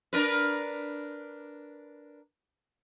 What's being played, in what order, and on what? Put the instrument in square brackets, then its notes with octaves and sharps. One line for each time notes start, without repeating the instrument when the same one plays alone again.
[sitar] D4 A#4 B4